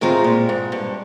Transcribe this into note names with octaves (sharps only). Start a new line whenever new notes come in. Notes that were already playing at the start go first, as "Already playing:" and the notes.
A2 G#3 C4 F4 A#4
A#2
G#2
G2